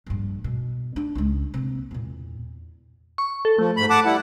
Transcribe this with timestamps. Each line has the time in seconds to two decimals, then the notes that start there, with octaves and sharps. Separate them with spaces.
0.06 A#1 G2
0.44 B2
0.96 D4
1.15 C#2 G#3
1.54 C3 A#3
1.91 E2 A#2
3.18 C#6
3.45 A4
3.58 F3 A3
3.77 G#2 B5
3.90 F#5 A5 D6
4.05 G3 E4 F#5